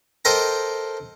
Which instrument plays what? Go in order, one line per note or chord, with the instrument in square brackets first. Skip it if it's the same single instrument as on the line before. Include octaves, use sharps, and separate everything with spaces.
[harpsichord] A4 A#4 C5 D#5 G5 A#5